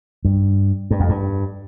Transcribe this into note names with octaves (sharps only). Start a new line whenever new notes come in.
G2
G2
F2
G2